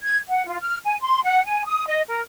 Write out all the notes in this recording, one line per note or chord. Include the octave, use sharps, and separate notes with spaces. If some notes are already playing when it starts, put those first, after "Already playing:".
G#6
F#5
F4
F6
G#5
C6
F#5
G#5
D#6
D#5
A#4